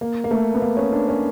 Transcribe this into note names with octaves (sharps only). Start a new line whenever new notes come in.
A#3
A#3
A3
B3
A#3
C#4
D4
C#4